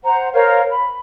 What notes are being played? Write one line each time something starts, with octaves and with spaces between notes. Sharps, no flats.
C5 F#5 A#5
A#4 C5 C#5 F5
B5